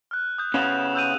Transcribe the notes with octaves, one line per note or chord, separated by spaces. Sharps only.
F6 F#6
D#6 G6
C#3 B3 C#4 E7 F7
E6 G6 D#7